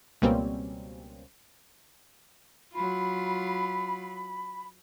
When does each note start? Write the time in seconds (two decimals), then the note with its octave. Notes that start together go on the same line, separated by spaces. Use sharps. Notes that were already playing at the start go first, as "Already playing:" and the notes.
0.22 C#2 B2 G3 A#3 C4 C#4
2.74 F#3 F4 B5